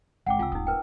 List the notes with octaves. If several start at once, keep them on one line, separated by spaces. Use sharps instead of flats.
G#1 F#5 G5 D6
C2 C4 F4 G#5 E6
D#1 G#1 D#4 D#6
A#4 B4 G5